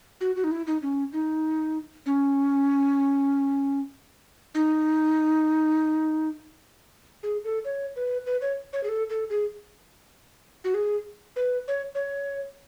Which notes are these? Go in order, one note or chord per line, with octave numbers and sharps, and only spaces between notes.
F#4
F#4
D#4
E4
D#4
C#4
D#4
C#4
D#4
G#4
A4
C#5
B4
B4
C#5
C#5
G#4
A4
A4
G#4
F#4
G#4
B4
C#5
C#5